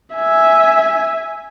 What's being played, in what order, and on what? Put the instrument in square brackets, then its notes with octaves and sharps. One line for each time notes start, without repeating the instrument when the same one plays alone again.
[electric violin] E5 G#5